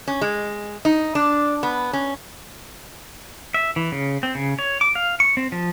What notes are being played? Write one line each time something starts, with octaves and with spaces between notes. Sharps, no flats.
C#4
G#3
D#4
D4
B3
C#4
E5
E3
C#3
C4
C#3
C#5
D6
F5
C#6
C4
F3